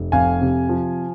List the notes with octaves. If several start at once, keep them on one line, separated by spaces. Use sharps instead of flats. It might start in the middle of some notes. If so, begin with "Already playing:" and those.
Already playing: F1
F2 F5 G#5
C3
F3